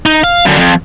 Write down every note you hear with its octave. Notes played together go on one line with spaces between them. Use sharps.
D#4
F5
F#2 D3
F2